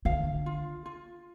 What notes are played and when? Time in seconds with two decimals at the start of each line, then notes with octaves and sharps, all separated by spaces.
0.05 D3 F5
0.46 F4
0.86 F4